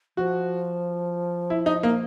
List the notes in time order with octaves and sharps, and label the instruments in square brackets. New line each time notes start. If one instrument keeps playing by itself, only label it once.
[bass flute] F3 [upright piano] F#4
[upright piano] E4
D#4
A#3